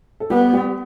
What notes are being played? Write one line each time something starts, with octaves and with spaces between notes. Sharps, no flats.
A4
G3 B3 G4
G3 G4